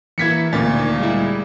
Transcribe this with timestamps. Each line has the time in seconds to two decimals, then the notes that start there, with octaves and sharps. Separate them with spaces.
0.18 E3 A#3 E4 G#6 B6 C#7
0.53 D2 A#2 A6
0.77 D#3
0.99 G3 G#3 E4